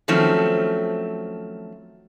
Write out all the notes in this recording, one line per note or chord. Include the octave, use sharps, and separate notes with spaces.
D#3 F3 F#3 A3 C4 C#4